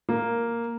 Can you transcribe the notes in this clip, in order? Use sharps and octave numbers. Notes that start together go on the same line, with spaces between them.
A#3